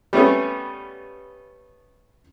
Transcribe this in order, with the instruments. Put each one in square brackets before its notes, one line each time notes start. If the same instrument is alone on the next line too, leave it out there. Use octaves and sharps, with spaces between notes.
[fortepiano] G3 A3 B3 C#4